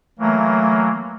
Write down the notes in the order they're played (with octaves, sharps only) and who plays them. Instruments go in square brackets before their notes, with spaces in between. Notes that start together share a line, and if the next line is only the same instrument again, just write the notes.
[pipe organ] E3 F#3 A#3 [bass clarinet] A3